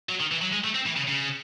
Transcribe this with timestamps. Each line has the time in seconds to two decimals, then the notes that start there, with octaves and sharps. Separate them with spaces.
0.09 F#3
0.20 D#3
0.31 E3
0.41 F#3
0.53 G#3
0.64 A3
0.75 C4
0.86 E3
0.96 C#3
1.07 C#3